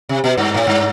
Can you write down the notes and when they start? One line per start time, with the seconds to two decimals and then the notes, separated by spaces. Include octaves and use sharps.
0.09 C3
0.24 B2
0.37 G2
0.54 A2
0.67 G2